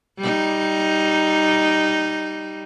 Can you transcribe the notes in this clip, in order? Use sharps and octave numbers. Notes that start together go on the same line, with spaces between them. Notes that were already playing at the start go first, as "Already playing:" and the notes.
G3 D#4